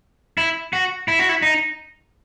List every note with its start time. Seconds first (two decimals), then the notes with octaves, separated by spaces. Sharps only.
0.38 E4
0.73 F#4
1.08 E4
1.19 F#4
1.29 E4
1.42 D#4